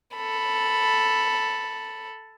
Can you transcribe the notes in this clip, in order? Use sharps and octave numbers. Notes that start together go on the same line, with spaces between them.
A4 B5